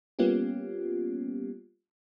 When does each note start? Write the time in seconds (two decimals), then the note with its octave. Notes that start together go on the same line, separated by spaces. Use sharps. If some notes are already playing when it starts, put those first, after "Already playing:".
0.19 G3 A#3 B3 C#4 F4 G4